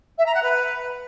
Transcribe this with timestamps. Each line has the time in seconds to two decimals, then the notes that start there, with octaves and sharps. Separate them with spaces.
0.18 E5
0.26 A#5
0.34 F#5
0.42 B4